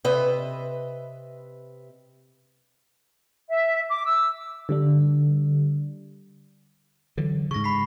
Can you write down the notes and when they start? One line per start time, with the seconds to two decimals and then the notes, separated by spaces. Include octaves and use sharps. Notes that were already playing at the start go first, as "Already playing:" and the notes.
0.04 C3 B4 D#5 E5
3.49 E5
3.88 D6
4.05 E6
4.69 D3 G3 D4
7.17 D3 E3 F#3
7.51 G#2 C#3 C#6 A#6
7.64 B5 B6 C7